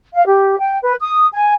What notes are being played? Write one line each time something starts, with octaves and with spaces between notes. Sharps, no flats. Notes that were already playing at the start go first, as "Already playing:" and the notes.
F5
G4
G5
B4
D#6
G#5